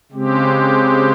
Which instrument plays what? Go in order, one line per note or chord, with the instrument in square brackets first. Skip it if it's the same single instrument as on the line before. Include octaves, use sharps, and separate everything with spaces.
[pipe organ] C#3 G#3 C4 G4